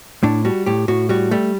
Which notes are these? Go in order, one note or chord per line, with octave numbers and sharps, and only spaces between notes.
A2 D4
G3 F#4
A2 G4
A2 F#4
G3 F#4
G3 A3